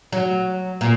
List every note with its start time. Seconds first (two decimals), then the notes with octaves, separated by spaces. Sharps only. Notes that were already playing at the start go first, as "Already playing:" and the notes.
0.12 F#3
0.81 A#2